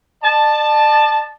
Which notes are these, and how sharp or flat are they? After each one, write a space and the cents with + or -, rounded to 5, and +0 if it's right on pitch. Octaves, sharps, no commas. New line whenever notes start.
D5 +45 A5 +0